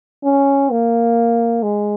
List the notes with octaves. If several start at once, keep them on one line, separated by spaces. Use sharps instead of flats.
C#4
A#3
G#3